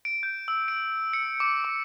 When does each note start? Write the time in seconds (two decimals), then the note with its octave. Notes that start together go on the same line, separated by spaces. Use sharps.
0.05 D7
0.23 G6
0.48 E6
0.68 D7
1.13 C#7
1.40 D6
1.64 D6